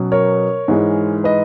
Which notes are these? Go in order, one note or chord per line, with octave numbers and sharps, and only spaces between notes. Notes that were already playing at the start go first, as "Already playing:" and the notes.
Already playing: B2 F#3 C#4
A#4 C#5
G#2 E3 G#3
B4 D#5